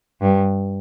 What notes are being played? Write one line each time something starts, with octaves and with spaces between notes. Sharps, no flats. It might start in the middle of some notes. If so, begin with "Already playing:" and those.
G2